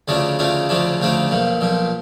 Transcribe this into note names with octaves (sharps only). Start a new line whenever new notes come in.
D2 C#3 F3 A3 D4
D2 C#3 F3 A3 D4
D2 C#3 F3 A3 D4
D2 C#3 F3 A3 D4
B1 A#2 F3
B1 A#2 F3